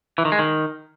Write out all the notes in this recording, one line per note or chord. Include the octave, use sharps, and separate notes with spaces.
E3
D#3
G#3
D#3